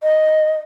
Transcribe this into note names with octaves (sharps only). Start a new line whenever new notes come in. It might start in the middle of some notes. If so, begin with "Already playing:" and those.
D#5